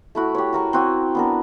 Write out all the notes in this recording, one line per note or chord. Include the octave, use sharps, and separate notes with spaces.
A3 E4 F#4
G4 C#5
F#4 A#4 C#6
C4 F#4 G#5
B3 D4 A#4